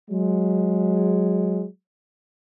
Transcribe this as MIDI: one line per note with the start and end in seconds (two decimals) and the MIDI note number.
0.11 1.66 54
0.11 1.66 56